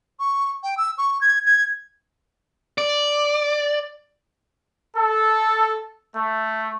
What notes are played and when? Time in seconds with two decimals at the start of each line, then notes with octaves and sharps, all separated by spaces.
0.20 C#6
0.63 G5
0.78 E6
0.98 C#6
1.21 G#6
1.46 G#6
2.78 D5
4.97 A4
6.16 A3